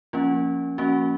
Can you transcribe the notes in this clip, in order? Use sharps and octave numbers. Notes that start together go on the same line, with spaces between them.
F3 A#3 C#4 F4
F3 A#3 C#4 F#4